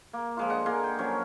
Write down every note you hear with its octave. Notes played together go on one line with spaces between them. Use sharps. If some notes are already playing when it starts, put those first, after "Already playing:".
A#3
F3 G#3 F4
D3 D#5 F#5
A#3 G#4 A#4 C6
G5
F3 F#3 C#4 C#5